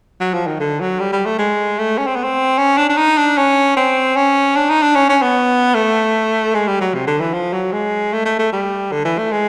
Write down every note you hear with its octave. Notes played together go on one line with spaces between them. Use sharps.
F#3
F3
D#3
D3
F#3
G3
G3
A3
G#3
A3
C#4
C4
B3
C4
C#4
D4
D4
D#4
D4
C#4
C4
C#4
D4
D#4
D4
C#4
C#4
B3
A3
G#3
G3
F#3
C3
D3
E3
F3
F#3
G#3
A3
A3
A3
G3
D3
E3
A3
G#3